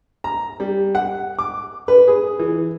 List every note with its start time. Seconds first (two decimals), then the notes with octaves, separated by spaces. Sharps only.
0.24 A#5
0.60 G3
0.95 F#5
1.39 D6
1.88 B4
2.08 G#4
2.39 E3